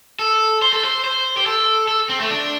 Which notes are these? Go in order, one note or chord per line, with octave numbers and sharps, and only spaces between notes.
A4
C5
A4
C5
C5
G4
A4
A4
C4
A3
D4